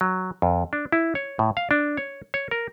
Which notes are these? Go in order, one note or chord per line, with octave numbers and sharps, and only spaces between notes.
F#3
F2
D4
E4
C#5
A2
F5
D4
C#5
C#5
A#4